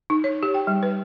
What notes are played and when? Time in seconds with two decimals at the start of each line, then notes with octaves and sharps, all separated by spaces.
0.10 D#4
0.24 C#5
0.43 G4
0.54 G5
0.67 G3
0.83 B4